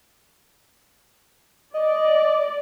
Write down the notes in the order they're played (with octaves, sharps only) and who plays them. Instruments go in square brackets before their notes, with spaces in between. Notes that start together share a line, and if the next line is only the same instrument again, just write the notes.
[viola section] D5 [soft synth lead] D#5